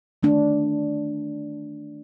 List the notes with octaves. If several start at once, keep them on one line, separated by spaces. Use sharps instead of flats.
D#3 A3 D4